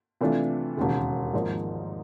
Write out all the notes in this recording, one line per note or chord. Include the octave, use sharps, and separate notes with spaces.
C3 E3 A3 D4 F4
E1 D#2 C#3
G#1 G#2 F3 A#3 D#4